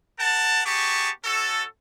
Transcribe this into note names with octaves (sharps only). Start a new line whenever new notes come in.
A#4 F#5 A5
B3 G4 G#4 A5 C#6
C#4 F#4 A4